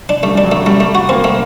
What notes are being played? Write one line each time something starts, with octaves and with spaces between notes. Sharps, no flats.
D4
G3 A3
G3 D4
F#3
A3
G3 A3
A3
F#4
A#3 C4
A3